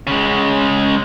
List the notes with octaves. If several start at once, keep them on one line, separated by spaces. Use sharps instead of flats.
C#3 G#3